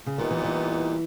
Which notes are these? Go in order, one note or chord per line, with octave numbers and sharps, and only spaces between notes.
C#3
A#2 D#3 G3 B3 D#4
E3
E3